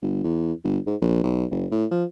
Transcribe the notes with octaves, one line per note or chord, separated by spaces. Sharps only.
G1
E2
G1
G#2
A#1
B1
F#1
A2
F3